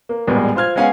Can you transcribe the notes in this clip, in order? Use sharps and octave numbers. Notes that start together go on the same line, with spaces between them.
A#3
A1 E2 A#2 G3 G#3
F4 C5 F6 G#6
G#3 B3 C#4 F5 F#5 G#5